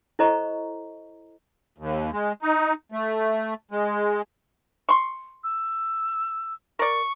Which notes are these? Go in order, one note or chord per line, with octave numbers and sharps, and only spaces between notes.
E4 A4 C5 D#5 A#5 C#6
D#2
G#3
D#4
A3
G#3
C6 C#6
E6
A#4 D5 C#6